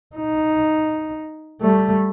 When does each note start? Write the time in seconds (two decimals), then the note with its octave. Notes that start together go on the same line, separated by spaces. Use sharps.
0.16 D#4
1.61 G3 A3